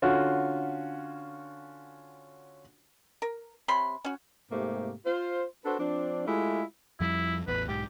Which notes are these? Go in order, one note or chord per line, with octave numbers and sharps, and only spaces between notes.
D3 C#4 F4 F#4
A#4
C3 C#5 B5 C6
C#4 F#4
G#2 C3 A3 A#3 G4
F4 C5
D4 F#4 A4 B4 C5
F3 C4 D4
G#3 A3 E4 F4 G4
F2 F3 G3 E4
A1 E2 B4
B1 G#2 G4